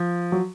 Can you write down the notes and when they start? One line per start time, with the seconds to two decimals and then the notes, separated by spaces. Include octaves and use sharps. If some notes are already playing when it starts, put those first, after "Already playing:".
Already playing: F3
0.32 F#3